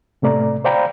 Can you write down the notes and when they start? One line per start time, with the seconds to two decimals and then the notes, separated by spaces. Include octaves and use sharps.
0.22 A2 C3 A3 D5 A#5
0.65 C5 D5 F5 G5 A#5 B5